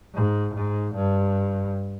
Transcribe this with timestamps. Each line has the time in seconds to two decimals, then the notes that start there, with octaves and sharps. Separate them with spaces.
0.14 G#2
0.54 G#2
0.95 G2